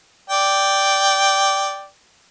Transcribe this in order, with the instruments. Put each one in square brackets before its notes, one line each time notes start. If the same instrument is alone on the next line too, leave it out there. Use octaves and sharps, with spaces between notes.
[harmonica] D5 G5